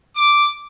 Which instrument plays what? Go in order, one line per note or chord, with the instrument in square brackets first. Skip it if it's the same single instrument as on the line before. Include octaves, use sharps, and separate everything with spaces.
[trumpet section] D6